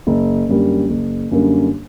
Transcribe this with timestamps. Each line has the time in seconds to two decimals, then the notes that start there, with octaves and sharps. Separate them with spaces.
0.07 F#1
0.49 F#2 D3 G3 A#3
0.89 F#1
1.31 F#2 D3 G3 A#3